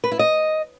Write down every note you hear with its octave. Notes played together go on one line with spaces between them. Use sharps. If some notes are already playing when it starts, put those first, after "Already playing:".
B4
E4
D#5